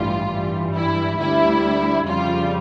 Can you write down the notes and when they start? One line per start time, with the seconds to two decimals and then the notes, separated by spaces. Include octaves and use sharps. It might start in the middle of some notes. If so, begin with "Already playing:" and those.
Already playing: A1 G2 E3 G3 F4
0.30 G2 E3 G3
0.75 E4
1.19 D2 D3 G3 E4
2.08 F2 C#3 G3 F4